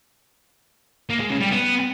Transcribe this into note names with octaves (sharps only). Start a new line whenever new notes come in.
A#3
G#3
C#3
G3
B3